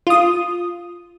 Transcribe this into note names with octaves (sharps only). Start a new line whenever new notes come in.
F4 D#6